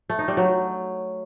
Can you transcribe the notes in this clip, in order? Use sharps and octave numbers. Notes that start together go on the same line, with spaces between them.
A3
D#4
G3
F#3